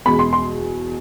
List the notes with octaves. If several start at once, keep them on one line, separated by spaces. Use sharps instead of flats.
E2 B2 G#3 B5
C6
C6